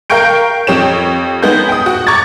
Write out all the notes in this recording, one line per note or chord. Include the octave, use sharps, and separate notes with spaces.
A#4 F5 G5 C#6 G6 D7
F2 G4 C#5 E7
G#3 B3 D#4 G#4 G6
G5 D#6
F#4
A#5 C#6 D6 G#6 A6